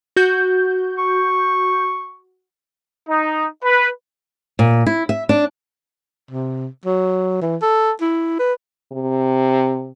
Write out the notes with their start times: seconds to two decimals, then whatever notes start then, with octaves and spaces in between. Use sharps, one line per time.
0.16 F#4 G6
0.98 C#6
3.09 D#4
3.64 B4
4.59 A#2
4.86 E4
5.09 E5
5.29 D4
6.31 C3
6.85 F#3
7.42 E3
7.62 A4
8.01 E4
8.39 B4
8.92 C3